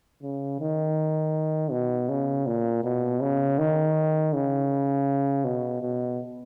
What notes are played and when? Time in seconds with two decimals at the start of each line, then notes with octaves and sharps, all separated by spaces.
0.23 C#3
0.60 D#3
1.71 B2
2.09 C#3
2.47 A#2
2.84 B2
3.22 C#3
3.59 D#3
4.34 C#3
5.45 B2
5.81 B2